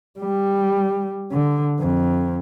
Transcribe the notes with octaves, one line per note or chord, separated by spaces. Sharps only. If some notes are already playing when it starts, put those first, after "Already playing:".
G3
D3
F2